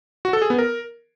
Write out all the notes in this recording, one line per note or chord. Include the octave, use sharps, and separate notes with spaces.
F#4
A4
G#4
B3
A#4